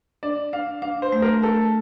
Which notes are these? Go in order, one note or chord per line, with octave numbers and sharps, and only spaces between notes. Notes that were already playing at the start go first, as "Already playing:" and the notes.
D4 D5
D4 F5
D4 F5
C5
A3
A#4
A3 A4